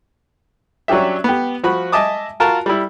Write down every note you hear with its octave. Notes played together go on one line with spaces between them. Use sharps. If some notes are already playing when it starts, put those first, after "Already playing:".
F#3 C#4 D4 G4 E5
B3 G4
F3 F#4 B5
D#5 E5 G#5 A5 D6 D#6
F4 F#4 A#4 A5
G3 E4